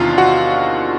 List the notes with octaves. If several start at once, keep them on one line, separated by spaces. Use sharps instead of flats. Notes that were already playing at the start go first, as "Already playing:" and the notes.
Already playing: E2 C3 D#3 D4 F4 F5
F#4 F#5